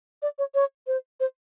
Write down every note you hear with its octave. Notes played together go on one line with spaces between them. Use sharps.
D5
C#5
C#5
C5
C5